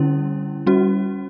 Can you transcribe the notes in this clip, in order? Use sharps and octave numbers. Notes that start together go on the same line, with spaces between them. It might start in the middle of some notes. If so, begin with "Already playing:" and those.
Already playing: D3 G3 C#4 E4
G3 C#4 F#4